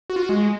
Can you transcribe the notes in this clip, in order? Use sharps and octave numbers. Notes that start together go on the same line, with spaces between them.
F#4
F4
F#4
G#3